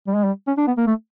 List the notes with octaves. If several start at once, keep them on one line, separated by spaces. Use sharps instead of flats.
G3
G#3
G3
C#4
D4
B3
A#3
A3